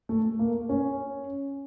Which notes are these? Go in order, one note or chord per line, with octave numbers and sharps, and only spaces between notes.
A3
A#3
C#4